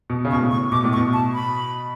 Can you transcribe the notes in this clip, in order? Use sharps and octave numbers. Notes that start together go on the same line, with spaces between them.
B2
C#3
B2 C#6
A2
C#6
B2 D6
A2
C#6
B2
A5
B5